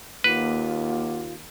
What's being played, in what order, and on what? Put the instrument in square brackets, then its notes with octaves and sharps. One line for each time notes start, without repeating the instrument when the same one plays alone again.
[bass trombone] D#2 [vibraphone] A#3 F#5 D6 [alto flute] F4 [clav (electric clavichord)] B4